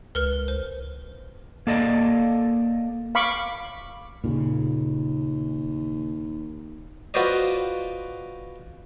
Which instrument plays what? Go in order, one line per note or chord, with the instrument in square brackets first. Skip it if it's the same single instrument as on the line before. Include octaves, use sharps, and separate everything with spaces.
[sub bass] C#2 [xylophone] A#4 B4 F6
[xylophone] C5
[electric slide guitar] A#3 A4 D5 D#5
[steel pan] F5 B5 C#6 D6
[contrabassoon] D#2 [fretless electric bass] A#2 C#3
[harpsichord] F4 F#4 B4 C5 D5 D#5